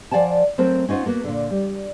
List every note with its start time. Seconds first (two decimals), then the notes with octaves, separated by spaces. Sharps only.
0.11 F3 D5 F#5 G#5 A5
0.58 F#3 A3 C4 A#4 C5
0.89 C#4 D#4 F4 C5 F#5
1.06 A#3 B3 F#4
1.24 A#2 D3
1.51 G3